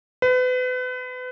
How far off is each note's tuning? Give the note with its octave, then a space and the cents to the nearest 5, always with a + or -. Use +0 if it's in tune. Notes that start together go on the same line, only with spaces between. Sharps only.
B4 +35